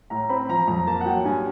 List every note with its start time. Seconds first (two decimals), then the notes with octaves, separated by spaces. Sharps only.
0.10 A2 A#5
0.29 C4 B5
0.49 F3 A#5
0.68 F2 A#5
0.87 A#3 A5
1.01 F#5
1.06 F#3 G5
1.25 G2 G#5